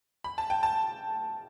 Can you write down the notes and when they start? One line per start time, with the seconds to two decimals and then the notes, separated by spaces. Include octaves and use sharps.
0.24 B5
0.38 A5
0.50 G5
0.63 A5